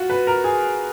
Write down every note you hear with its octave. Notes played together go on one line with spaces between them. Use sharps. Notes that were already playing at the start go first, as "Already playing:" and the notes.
Already playing: F4 F#4
B4
A#4
G#4